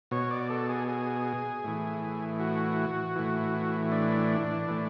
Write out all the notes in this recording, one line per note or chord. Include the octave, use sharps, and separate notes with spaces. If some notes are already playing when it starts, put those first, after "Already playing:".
B2 C#5
D5
A4
G#4
G#4
A2 E3
F#4
A2 E3
D4
A2 E3